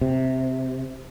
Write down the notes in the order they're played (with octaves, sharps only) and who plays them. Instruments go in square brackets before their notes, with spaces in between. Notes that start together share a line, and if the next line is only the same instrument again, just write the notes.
[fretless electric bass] C3